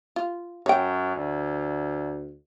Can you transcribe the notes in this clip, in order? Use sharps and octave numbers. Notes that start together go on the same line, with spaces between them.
F4
F#2 C#5 G5
D2